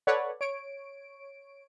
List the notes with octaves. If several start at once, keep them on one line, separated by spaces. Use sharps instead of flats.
A4 B4 C#5 D5 F#5
C#5 D7